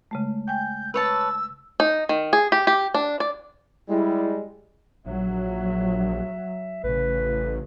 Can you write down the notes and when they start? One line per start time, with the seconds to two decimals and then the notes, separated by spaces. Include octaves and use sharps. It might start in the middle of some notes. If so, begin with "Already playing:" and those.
0.11 C#3 G#3 A3
0.48 G5 G#5 G6
0.94 B4 C#5 A5 E6
1.80 D#4
2.09 D#3
2.33 G#4
2.52 G4
2.67 G4
2.94 D4
3.20 D5
3.89 G3 G#3 E4
5.06 A#1 F#3 E5
6.84 A1 C#3 B4